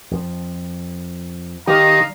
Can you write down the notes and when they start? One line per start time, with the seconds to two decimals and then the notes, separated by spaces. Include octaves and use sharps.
0.11 F2 F3
1.67 D#3 G3 G4 F5 A#5